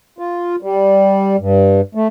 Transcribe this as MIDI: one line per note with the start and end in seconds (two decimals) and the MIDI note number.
0.18 0.56 65
0.62 1.36 55
1.39 1.81 43
1.95 2.07 57